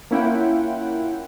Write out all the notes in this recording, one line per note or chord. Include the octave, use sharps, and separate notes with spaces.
A#3 C#4 E4 F4 F#5 G5